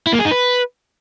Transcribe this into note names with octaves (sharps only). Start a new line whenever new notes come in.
E4
A#3
G#4
D#4
B4